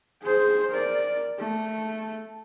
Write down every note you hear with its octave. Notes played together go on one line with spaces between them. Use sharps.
G#4 C5
A#4 D5
A3